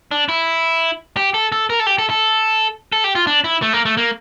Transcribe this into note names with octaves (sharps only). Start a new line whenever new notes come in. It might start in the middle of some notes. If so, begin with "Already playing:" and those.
D4
E4
G4
A4
A4
A#4
A4
G4
A4
A4
A4
G4
F4
D4
E4
A3
A#3
A3
A#3